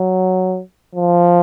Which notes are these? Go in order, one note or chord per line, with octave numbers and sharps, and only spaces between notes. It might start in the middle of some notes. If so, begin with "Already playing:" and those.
Already playing: F#3
F3